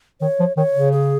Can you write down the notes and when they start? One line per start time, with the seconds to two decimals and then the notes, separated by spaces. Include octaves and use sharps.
0.21 D#3 C#5
0.40 F3
0.57 D#3 C#5
0.74 C#3
0.92 G#4